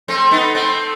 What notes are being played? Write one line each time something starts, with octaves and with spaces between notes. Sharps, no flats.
A3 C4
B3 D#4
A3 C4